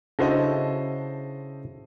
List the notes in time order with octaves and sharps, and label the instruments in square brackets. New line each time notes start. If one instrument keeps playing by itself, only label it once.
[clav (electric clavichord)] C#3 E4 F#4 [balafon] C#4 D4 [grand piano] A4 C5 D#5